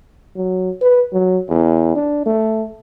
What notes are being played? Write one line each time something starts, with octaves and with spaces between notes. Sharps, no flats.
F#3
B4
F#3
E2
D4
A3